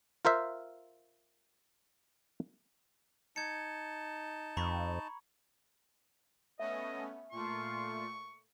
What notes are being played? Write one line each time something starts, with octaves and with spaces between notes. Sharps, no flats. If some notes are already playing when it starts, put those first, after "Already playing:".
F4 A#4 C5 E5 F5
D#4 A5 G#6 C#7
F2 A#5 B5 C#6
A3 B3 C#4 D#5 E5
A#2 A3 F4 C#6